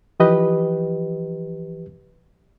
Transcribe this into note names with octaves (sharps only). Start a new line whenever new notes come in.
E3 F3 G4 B4 D#5